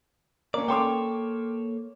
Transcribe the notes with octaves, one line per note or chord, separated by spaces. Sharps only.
A#3 C#4 D5
A#3 A4 C#5 G5 C6 D6